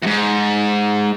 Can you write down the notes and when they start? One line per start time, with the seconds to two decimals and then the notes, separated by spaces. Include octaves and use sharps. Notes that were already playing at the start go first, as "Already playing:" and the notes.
0.02 E2 G#2